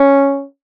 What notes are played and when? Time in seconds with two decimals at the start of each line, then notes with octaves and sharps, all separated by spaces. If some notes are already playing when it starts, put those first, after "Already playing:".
Already playing: C#4